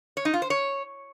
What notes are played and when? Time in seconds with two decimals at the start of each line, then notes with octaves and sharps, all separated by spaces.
0.17 C#5
0.25 D#4
0.34 F4
0.42 C5
0.50 C#5